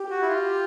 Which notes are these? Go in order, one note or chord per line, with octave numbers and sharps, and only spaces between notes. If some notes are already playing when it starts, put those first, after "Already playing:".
Already playing: G4
F#4
E4
F4